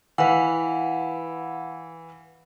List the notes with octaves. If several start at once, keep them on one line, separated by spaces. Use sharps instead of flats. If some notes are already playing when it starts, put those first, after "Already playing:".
E3 B4 F5 F#5